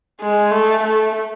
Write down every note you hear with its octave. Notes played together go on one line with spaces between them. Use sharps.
G#3
A3
A3